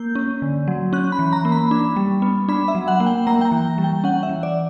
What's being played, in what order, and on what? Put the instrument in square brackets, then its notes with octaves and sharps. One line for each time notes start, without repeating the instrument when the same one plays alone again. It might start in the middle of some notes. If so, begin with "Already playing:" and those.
Already playing: [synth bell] A#3 G6
C#4
D3
F#3
C#4 F#6
B5
E3
A#5
A#3
B5
D4
G3
B3
D4 B5
E5
F#3
F#5
A#3
G5
A#3 A#5
G5
A#5
E3
G3
G5
C#4 F#5
E5
E3
D5